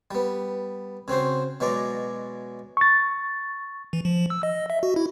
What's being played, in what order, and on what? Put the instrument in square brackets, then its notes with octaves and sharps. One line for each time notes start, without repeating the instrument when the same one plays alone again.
[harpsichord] G3 B3
C#3 C4 F#4 C5
B2 F#3 G#3 D5 A#5 D6
[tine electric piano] C#6 A6
[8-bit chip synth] E3
F3
E6
D#5
E5
F#4
E4